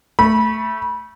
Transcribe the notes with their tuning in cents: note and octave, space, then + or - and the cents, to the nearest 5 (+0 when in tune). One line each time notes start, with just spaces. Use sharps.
A3 +0 B5 -25